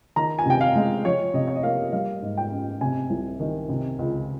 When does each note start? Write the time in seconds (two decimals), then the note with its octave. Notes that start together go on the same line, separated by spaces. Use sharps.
0.16 D#3 A#5
0.39 G#5
0.46 C3 G5
0.61 F5
0.76 G#3
1.05 F3 C#5
1.34 C3 D#5
1.48 C#5
1.56 D#5
1.63 A#3 F5
1.93 G3 F5
2.22 G#2
2.37 G5
2.51 C#4
2.81 C3 G#5
3.10 C2
3.40 D#3
3.69 C3
3.99 C#2